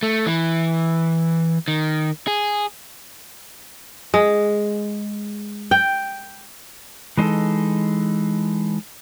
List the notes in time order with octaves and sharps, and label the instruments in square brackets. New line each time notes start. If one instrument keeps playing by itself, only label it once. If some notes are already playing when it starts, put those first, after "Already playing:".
[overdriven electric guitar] A3
E3
D#3
G#4
[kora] G#3
G5
[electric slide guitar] E3 G#3 D4 D#4 A4